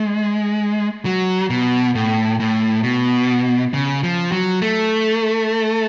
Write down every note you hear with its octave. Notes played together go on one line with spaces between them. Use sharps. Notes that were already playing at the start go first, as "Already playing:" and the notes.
Already playing: G#3
F#3
B2
A2
A2
B2
C#3
F3
F#3
A3